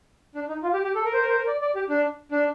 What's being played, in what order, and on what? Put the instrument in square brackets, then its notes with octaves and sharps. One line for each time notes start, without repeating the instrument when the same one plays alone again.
[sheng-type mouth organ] D4
D#4
F4
G4
G4
A4
A#4
C5
A#4
C5
A#4
D5
D5
G4
D4
D4